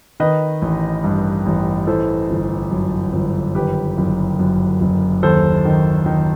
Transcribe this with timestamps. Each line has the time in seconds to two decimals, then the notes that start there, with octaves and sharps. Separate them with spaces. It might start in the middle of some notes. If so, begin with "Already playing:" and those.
0.20 D#3 B4 D#5
0.62 A1
1.04 G2
1.46 A1
1.87 E3 A4 C5
2.30 G1
2.71 F#2
3.13 G1
3.55 D#3 G4 B4
3.98 F#1
4.39 F#2
4.81 F#1
5.23 D#2 A4 C5
5.65 D#3
6.06 D#3